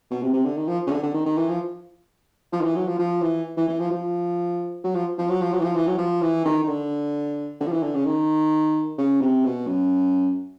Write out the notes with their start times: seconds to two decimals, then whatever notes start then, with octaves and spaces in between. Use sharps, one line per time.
0.11 B2
0.22 C3
0.34 C3
0.45 D3
0.57 D#3
0.68 F3
0.87 C#3
0.91 D3
1.03 D3
1.14 D#3
1.26 D#3
1.38 E3
1.49 F3
2.53 F3
2.61 D#3
2.64 E3
2.76 F#3
2.87 F3
2.99 F3
3.22 E3
3.57 E3
3.68 E3
3.79 F3
3.91 F3
4.84 F#3
4.95 F3
5.18 F3
5.30 F#3
5.41 F3
5.53 F#3
5.60 E3
5.64 F3
5.75 E3
5.87 F#3
5.98 F3
6.22 E3
6.45 D#3
6.64 D#3
6.68 D3
7.61 D3
7.67 F3
7.72 E3
7.83 D3
7.95 C#3
8.06 D#3
8.98 C#3
9.21 C3
9.45 B2
9.67 F#2